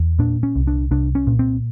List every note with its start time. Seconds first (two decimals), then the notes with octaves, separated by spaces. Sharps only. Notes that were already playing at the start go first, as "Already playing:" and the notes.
Already playing: E2
0.19 A#2 D4
0.43 C#4
0.55 C2
0.67 D4
0.91 C2 D4
1.15 C#4
1.27 A#2
1.39 C4